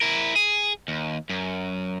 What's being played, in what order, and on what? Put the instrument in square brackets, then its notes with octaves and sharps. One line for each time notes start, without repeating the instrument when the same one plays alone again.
[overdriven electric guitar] E4 A#4
G#4
D#2
F#2